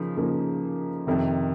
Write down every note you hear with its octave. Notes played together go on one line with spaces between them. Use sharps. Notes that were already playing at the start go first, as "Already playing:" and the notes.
Already playing: C#3 F3 A#3 D#4
C#3 F3 A#3 D#4
F2 C3 D#3